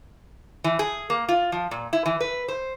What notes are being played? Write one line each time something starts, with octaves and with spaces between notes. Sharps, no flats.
E3
G#4
A#3
F4
F3
A#2
E4
E3
B4
C5